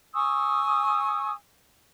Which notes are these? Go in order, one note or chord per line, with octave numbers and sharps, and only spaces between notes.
G#5 C#6 D#6 E6